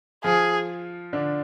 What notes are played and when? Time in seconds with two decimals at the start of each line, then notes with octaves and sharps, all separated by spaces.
0.24 F3 F4 G#4
1.13 D3 D4